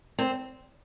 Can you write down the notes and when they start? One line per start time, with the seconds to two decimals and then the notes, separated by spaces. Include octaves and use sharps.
0.19 C4